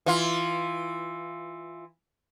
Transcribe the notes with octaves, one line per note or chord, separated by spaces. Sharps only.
E3 F4